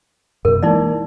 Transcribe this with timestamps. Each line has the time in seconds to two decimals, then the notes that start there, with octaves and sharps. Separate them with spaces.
0.45 F#2 B2 A#4
0.63 E3 G#3 A#3 D#4 E4 D5